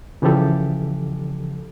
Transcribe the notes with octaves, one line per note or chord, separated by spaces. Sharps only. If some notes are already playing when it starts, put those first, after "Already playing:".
C#3 E3 F3 G4 A4